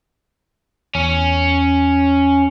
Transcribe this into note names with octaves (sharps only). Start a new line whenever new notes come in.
E2 C#4